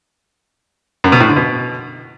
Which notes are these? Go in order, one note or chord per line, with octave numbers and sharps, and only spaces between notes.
F#2
B2
A2
D3
B2